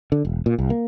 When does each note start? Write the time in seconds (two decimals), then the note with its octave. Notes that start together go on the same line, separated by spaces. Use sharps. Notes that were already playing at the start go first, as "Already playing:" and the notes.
0.12 D3
0.25 E1
0.46 A#2
0.59 C2
0.70 A#3